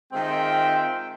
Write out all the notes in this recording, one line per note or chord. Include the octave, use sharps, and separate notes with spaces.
D#3 G#3 C4 F4 E5 G5